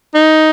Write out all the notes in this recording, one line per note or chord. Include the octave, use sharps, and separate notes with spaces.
D#4